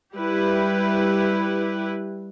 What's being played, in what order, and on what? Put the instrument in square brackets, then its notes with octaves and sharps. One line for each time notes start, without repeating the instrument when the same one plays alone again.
[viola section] G3 E4 G4 B4